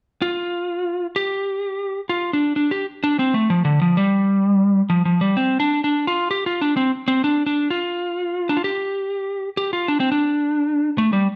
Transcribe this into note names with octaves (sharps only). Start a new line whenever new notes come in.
F4
G4
F4
D4
D4
G4
D4
C4
A3
F3
D3
F3
G3
F3
F3
G3
C4
D4
D4
F4
G4
F4
D4
C4
C4
D4
D4
F4
D4
F4
G4
G4
F4
D4
C4
D4
A3
G3